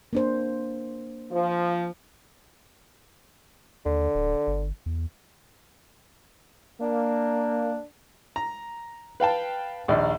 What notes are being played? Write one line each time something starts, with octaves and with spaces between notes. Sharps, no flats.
A#3 D4 C5
F3
D#2 D3
D1
G1
E2
A#3 D4
A#5
B4 F5 G5 A5
A#1 D#2 D5